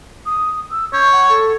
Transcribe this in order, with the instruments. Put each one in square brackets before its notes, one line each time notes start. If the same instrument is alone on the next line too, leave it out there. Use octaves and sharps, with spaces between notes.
[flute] D#6
E6
[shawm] C#5 [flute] G6
[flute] F#5
A4